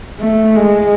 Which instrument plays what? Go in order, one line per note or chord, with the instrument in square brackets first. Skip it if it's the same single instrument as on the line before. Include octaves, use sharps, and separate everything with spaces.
[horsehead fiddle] A3
G#3